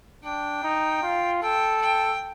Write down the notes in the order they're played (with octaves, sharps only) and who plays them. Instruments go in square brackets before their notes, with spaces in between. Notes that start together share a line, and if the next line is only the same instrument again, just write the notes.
[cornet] D4 [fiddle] G5
[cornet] D#4
F4
[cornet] A4 [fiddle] G5
[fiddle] G5